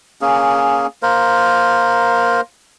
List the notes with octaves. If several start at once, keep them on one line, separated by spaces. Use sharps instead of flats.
A#3 C#4 G#4
A#3 A#4 C5